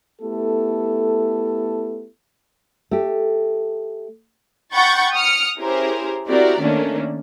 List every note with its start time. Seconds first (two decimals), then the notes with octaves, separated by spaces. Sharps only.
0.22 A3 B3 E4 G4 A4
2.91 A3 G4
4.73 F#5 G5 B5 C#6 G6 A6
5.13 D#6 F6 C#7
5.59 C#4 E4 G4 G#4 A#4 C5
6.27 C4 E4 F#4 G4 A#4 D5
6.61 D#3 A3 A#3 C#4 D4